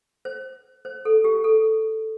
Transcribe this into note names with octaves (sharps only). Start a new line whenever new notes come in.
C5
C5
A4
G4
A4